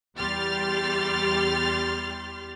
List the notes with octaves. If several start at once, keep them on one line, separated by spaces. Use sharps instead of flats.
E2 G3 G4 C6 F6 A6